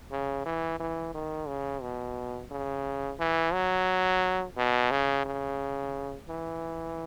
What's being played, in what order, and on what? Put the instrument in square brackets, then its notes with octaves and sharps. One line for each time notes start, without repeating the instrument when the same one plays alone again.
[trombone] C#3
E3
E3
D#3
C#3
B2
C#3
E3
F#3
B2
C#3
C#3
E3